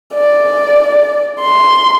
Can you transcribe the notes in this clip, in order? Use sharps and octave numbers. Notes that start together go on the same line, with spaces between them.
D5
C6